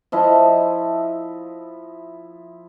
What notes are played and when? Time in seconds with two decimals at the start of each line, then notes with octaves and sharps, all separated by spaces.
0.12 F3 E4 D#5